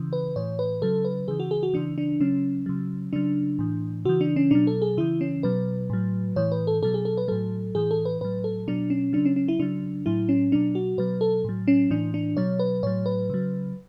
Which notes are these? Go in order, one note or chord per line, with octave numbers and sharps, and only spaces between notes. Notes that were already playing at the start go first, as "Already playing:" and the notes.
Already playing: C#3 E3
B4
A2 E3 C#5
B4
C#3 F#3 A4
B4
C#3 E3 G#4
F#4
G#4
F#4
C#3 E3 D4
D4
C#3 F#3 C#4
C#3 F#3
C#3 F#3 D4
A2 E3
C#3 E3 F#4
D4
C#4
B2 F#3 D4
A4
G#4
C#3 E3 E4
C#4
B2 F#3 B4
A2 F#3
A2 E3 C#5
B4
A4
B2 F#3 A4
G#4
A4
B4
A2 F#3 A4
A2 E3 G#4
A4
B4
A2 F#3 B4
A4
B2 F#3 D4
C#4
C#3 F#3 D4
C#4
C#4
E4
C#3 F#3 D4
A2 F#3 E4
C#4
B2 F#3 D4
F#4
B2 F#3 B4
A4
A2 F#3
C#4
A2 E3 D4
D4
B2 F#3 C#5
B4
A2 F#3 C#5
B4
C#3 F#3